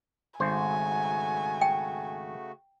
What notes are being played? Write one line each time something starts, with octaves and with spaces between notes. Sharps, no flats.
G#1 C#3 A3 F#4 C5 G#5
G5